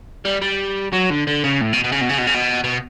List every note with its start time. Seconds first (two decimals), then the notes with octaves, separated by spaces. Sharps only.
0.25 G3
0.41 G3
0.92 F#3
1.10 D3
1.27 D3
1.44 C#3
1.61 A2
1.73 B2
1.84 B2
1.92 C#3
2.01 B2
2.09 C#3
2.18 B2
2.27 C#3
2.34 B2
2.64 B2